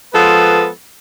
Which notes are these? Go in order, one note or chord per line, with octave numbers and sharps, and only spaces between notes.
F3 G#3 B3 A4 B4